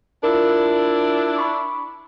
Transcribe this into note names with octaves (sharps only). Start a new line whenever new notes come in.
D4 E4 F4 A#4
B5 C#6 D6